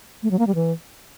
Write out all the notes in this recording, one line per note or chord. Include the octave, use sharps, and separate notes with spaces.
A3
F#3
A#3
G3
E3